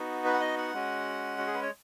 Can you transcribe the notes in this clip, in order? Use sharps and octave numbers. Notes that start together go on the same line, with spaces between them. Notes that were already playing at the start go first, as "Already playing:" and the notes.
Already playing: B3 D#4 F#4
B4
F#5
D#5
F#5
G#3 C#4 F#4
F#4
G#4
B4
C#5